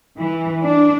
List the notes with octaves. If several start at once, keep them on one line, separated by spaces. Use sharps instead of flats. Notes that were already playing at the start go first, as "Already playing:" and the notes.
E3
D4